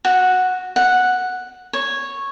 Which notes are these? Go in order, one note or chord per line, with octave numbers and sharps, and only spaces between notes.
F#4
F#5
C#5